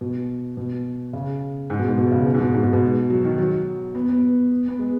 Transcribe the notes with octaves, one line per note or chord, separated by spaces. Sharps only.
B2
B2
C#3
G#2
B2
G#2
B2
C#3
B2
G#2
B2
G#2
B2
B2
F#3
D#3
F#3
B3
B3
B3
G#3